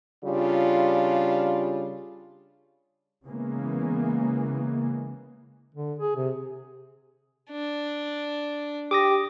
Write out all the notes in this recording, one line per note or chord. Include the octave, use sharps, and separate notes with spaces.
C#3 G3 D4 F4
C#3 E3 G#3 A#3 B3
D3
G#4
C3
D4
G4 D6 D#6 A#6